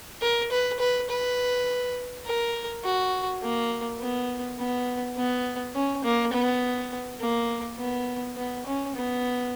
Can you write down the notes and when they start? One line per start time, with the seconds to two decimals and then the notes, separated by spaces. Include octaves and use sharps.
0.22 A#4
0.51 B4
0.79 B4
1.10 B4
2.25 A#4
2.84 F#4
3.42 A#3
4.00 B3
4.58 B3
5.17 B3
5.75 C#4
6.04 A#3
6.33 B3
7.20 A#3
7.79 B3
8.37 B3
8.66 C#4
8.95 B3